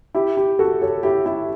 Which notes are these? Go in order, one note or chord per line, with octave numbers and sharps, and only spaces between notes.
E4 G4
E4 G4
F#4 A4
A4 C#5
E4 G4
E4 G4